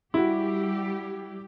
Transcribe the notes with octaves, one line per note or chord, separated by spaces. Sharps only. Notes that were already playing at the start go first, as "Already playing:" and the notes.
G3 E4 F#4 G4